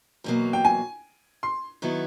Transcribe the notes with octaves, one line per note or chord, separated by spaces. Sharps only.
E2 B2 F#3 A#3
G5
G#5
C6
D#3 F#3 B3 E4